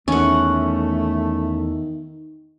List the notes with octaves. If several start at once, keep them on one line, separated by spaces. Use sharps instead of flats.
E2 D#3 A3 C#4 F#5